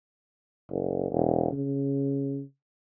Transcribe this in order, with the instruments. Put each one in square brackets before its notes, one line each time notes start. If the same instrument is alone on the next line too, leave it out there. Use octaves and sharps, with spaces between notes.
[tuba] F#1
E1
C#3